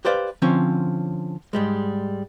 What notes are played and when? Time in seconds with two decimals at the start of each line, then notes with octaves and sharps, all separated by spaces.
0.05 G4 B4 C5 D5 F5
0.42 D3 F3 C4 C#4 C#5
1.53 G#2 G3 G#3